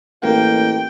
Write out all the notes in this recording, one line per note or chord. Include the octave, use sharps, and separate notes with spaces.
A1 A#3 G5